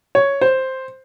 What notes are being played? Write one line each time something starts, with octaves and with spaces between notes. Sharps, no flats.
C#5
C5